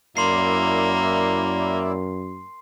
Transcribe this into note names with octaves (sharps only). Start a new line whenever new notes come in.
F#2 A#3 E4 D5 E5 C6 C7